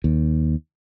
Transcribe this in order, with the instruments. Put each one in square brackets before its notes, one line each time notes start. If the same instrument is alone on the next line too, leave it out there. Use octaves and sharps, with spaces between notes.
[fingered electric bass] D#2